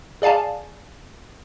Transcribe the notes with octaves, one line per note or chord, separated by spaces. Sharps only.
G#4 D5 F5 G#5 A5